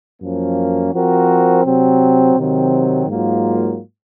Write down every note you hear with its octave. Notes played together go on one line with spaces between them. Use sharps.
F#2 F3 A#3 C#4
F3 C4 F#4 A#4
C3 F#3 C4
C3 D#3 F#3 C4
G#2 F#3 A#3 F4